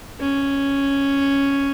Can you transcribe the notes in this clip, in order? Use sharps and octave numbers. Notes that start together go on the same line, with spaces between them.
C#4